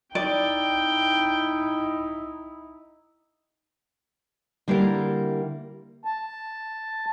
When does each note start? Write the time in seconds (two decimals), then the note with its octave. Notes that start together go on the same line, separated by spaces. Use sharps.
0.15 D#4 E4 D5 G5
4.68 D3 G3 A#3 E4 G4 A#4
6.05 A5